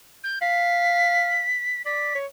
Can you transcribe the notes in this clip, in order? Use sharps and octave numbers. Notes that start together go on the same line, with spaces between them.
G6
F5 B6
D5 B6
C#5